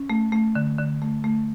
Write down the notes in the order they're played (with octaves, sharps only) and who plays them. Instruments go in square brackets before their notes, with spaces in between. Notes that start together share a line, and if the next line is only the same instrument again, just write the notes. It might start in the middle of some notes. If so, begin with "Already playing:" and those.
Already playing: [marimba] C#4
A3
A3
D3
D3
A3
A3